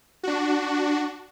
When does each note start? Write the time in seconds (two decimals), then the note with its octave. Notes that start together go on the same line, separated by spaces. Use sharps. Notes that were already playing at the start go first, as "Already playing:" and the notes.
0.23 D4 F#4